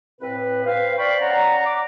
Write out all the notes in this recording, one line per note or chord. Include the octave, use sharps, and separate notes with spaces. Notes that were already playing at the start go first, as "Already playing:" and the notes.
C2 A2 C4 B4
C4 B4 C5 F5
C5 D5 F5 G5 B5 C#6
C#4 D5 F#5 A#5
D6